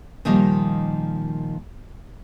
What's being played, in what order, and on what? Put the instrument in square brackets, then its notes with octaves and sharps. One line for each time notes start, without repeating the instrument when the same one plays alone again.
[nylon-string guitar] A#2 D#3 F3 G3 A#3 D#4